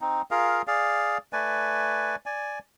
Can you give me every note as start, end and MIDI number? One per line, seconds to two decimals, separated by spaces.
0.01 0.22 60
0.01 0.22 63
0.31 0.62 65
0.31 0.62 68
0.31 0.62 70
0.31 0.62 77
0.67 1.18 68
0.67 1.18 74
0.67 1.18 77
1.33 2.16 57
1.33 2.16 71
1.33 2.16 74
1.33 2.16 80
2.26 2.59 74
2.26 2.59 80